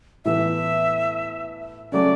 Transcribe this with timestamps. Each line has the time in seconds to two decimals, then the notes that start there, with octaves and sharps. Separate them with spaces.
0.25 A2 E3 B3 E5
1.92 C#3 F#3 A3 C#4 D5